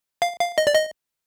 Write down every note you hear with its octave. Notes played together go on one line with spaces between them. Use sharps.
F5
F5
D#5
D5
D#5